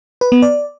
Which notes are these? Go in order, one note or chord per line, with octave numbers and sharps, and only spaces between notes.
B4
B3
D5